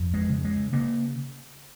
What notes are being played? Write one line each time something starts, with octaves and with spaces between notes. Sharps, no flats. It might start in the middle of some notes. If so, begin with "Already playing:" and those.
Already playing: F2
G#3
C#3
G#3
C#3 A#3